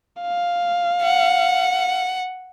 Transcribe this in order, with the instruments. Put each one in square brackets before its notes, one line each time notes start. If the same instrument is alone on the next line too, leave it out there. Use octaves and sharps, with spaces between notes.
[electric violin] F5
[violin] F#5